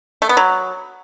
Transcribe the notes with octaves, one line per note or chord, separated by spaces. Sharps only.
A3
B3
F#3